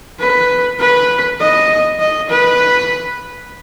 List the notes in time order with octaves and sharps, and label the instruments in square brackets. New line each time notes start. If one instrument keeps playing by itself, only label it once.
[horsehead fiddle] B4
B4
D#5
D#5
B4